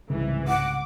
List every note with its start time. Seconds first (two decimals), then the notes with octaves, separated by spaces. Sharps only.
0.10 C2 G#2 C#3 E3
0.48 F#5 D6